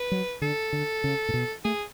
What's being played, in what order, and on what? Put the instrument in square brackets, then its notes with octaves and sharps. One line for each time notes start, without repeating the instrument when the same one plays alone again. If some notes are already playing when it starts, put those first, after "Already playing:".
Already playing: [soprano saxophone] B4
[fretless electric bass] F#3
[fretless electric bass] D3 [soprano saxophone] A4
[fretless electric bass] D3
C#3
A2
B2
[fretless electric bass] A3 [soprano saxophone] G#4